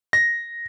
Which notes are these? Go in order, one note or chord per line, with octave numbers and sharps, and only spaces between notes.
A#6